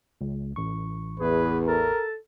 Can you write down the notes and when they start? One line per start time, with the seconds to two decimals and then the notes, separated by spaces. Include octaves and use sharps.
0.21 C#2
0.56 A1 C#6
1.20 E2 G#4 B4
1.68 A4 A#4